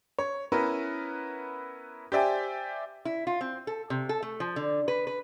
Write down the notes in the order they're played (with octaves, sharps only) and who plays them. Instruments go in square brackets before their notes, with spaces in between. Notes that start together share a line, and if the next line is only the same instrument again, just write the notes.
[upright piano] C#5
B3 C#4 E4 A#4 B4
G4 C5 D5 E5 G5 G#5
[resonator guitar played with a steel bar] E4
F4
C4
A4
C3
A4
A3
F3
D3
B4
B4